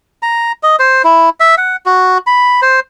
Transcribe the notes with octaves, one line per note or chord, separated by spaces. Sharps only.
A#5
D#5
C5
E4
E5
F#5
F#4
B5
C5